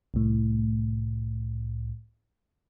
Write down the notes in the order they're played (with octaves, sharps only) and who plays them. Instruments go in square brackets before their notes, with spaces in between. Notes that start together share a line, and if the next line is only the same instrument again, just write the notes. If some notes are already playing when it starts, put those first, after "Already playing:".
[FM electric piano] C2 A2